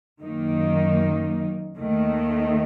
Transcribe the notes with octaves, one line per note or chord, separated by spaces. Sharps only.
F#2 D#3 A#3 D#4
D#2 D#3 A3